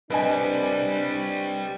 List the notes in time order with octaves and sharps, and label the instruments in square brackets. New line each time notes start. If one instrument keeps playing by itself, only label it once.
[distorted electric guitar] G3 C4 [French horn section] D4 [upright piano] B4 D#5 G#5